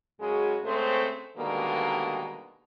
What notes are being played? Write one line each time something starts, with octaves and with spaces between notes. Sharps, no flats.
F#2 C#3 G#3 F#4 G#4
C#3 G#3 A3 C4 C5
B2 D3 D#3 G3 G#3 A#3